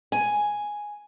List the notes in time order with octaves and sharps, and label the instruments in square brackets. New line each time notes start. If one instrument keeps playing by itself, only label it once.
[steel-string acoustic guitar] G#5